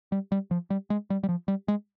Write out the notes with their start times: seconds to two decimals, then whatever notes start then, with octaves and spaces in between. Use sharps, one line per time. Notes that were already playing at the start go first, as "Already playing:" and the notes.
0.12 G3
0.32 G3
0.51 F3
0.70 G3
0.90 G#3
1.10 G3
1.23 G3
1.29 F3
1.48 G3
1.68 G#3